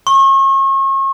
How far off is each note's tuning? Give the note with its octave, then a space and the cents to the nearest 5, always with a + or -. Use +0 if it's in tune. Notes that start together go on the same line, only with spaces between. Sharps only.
C#6 -35